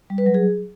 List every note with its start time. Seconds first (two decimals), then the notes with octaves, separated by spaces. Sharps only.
0.10 G3
0.18 B4
0.26 F#3
0.34 G#4